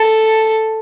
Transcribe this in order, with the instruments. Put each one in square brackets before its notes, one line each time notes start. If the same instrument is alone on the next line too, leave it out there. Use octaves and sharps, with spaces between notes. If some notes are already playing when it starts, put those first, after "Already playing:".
Already playing: [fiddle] A4